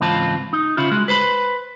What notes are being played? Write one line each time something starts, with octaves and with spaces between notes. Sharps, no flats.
C#2 G#2 E3 C4 F4 A5
D#4
C#3 C#4 E4 F4
G#3 F#4
B4 C5 B5